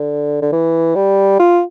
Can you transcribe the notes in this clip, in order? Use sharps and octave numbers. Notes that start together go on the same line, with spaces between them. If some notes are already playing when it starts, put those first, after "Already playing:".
Already playing: D3
D3
E3
G3
F4